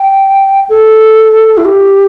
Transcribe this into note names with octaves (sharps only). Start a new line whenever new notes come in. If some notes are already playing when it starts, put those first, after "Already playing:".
Already playing: G5
A4
E4
G4